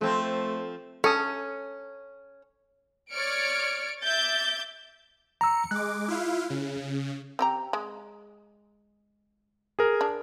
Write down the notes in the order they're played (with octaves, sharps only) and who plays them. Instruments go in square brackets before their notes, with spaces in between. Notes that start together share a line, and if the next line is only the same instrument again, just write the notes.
[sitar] F3 C4 [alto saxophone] A3
[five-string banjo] C#4 [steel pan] A4 D#6
[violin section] C#5 D5 F6 C#7 D7
E5 D6 G6 A6
[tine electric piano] A#5 E6 [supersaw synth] C#7
[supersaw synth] G#3 D6 [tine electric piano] F#6
[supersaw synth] E4 F4 F5
C#3
[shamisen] C4 G4 A#5
G#3
[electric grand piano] G#4 A#4
[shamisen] D4